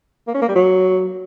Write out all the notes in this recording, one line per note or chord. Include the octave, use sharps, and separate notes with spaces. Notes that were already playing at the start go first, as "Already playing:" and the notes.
A#3
C#4
A#3
G3
F#3